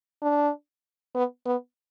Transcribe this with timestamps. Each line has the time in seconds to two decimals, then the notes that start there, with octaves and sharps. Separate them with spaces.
0.22 D4
1.15 B3
1.46 B3